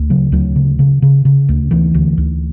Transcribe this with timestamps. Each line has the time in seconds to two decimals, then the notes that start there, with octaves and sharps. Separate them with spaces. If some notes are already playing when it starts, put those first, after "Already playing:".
Already playing: D2
0.10 C#3 F#3
0.32 D2 F#3
0.56 C#3
0.79 C#3
1.02 C#3
1.25 C#3
1.49 D2
1.71 D2 E3
1.94 D2
2.18 D2